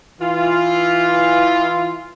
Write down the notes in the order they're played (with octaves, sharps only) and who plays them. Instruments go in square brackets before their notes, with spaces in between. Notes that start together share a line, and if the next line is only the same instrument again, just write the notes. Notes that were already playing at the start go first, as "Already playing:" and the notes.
[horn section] E3 F4